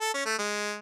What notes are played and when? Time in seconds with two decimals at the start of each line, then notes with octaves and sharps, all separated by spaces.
0.01 A4
0.14 C#4
0.26 A3
0.38 G#3